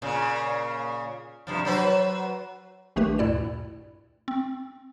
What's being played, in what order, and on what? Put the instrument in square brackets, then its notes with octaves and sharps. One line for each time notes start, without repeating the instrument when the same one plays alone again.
[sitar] A#2 C#3
G2 C3 F3
F#3 B4 C5
[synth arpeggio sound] A#1 D#3 A3 D4 G4 B4
D2 G2 A#2 E4 D5 E7
C4